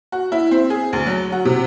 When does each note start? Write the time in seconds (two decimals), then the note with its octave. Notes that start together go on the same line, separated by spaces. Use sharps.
0.12 F#4
0.32 E4
0.51 C4
0.70 G#4
0.93 D2
1.07 F#3
1.32 F#4
1.45 C3